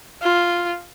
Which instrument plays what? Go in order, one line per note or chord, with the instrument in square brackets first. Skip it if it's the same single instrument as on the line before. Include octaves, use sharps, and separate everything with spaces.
[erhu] F4